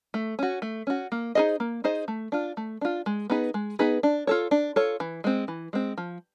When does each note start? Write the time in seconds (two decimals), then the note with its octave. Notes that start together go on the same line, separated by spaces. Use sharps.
0.14 A3
0.39 C#4 F#4
0.62 A3
0.87 C#4 F#4
1.12 A#3
1.35 D#4 G#4 C5 D#5
1.60 A#3
1.84 D#4 G#4 C5 D#5
2.08 A3
2.32 D4 F4
2.57 A3
2.81 D4 F4
3.06 G#3
3.30 B3 D#4 G#4 B4
3.54 G#3
3.79 B3 D#4 G#4 B4
4.03 D4
4.27 F4 A4 C#5
4.51 D4
4.76 F4 A4 C#5
5.00 E3
5.24 G#3 C4
5.48 E3
5.73 G#3 C4
5.98 F3